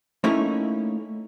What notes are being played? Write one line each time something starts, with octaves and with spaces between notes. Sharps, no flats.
A3 A#3 C#4 D#4 E4 C#5